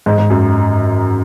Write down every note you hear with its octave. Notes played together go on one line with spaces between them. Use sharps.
G#2
G#2
F#2